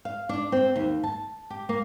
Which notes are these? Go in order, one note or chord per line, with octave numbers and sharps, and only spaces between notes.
F5
D4
C4
D#2
A5
G4
A#3